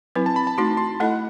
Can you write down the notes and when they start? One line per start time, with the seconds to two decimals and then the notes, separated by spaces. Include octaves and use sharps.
0.15 F#3 C4 E4 B4
0.26 A5
0.36 B5
0.47 A5
0.58 A3 D#4 F#4 C6
0.77 C6
1.00 A3 E4 A4 D#5 F#5